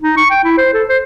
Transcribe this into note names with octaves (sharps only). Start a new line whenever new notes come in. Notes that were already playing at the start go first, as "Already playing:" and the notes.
D#4
C#6
G5
E4
C5
A4
C5